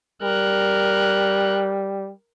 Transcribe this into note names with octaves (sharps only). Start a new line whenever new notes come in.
G3 A#4 F#6